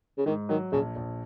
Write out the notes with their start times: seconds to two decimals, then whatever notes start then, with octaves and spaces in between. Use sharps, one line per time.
0.18 C#3
0.26 G#2 D#3
0.49 D#3 F#3
0.72 A#1 C#3
0.96 A#1